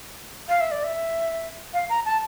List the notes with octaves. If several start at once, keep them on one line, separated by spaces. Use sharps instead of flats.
F5
E5
D5
E5
F5
A#5
A5